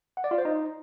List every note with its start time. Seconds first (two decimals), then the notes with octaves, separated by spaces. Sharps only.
0.17 F#5
0.24 D5
0.31 F4
0.38 C5
0.45 D#4